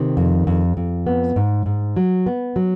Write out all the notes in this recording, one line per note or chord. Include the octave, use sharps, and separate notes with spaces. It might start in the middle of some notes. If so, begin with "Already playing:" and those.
Already playing: C3 D#3
F2
F2
F2
B3
G#2
G#2
F#3
B3
F#3